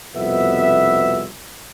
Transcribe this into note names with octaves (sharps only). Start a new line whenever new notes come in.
C2 F2 B2 B3 E5